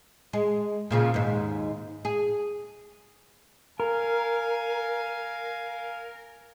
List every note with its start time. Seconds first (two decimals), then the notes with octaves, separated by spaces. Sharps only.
0.33 G#3
0.91 A#2 C#3 F3
1.14 D#2 G#2
2.05 G#4
3.80 A#4 F5 G#5